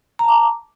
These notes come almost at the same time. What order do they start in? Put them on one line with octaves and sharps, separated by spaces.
A#5 A5 D6